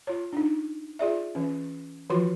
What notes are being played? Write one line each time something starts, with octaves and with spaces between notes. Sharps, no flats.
F4 C#5
D4 D#4
F4 G#4 D5 E5
E3 C#4
E3 F3 F4 F#4 C6